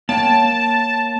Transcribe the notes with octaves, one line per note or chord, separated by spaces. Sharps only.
A#3 C#5 G5 A5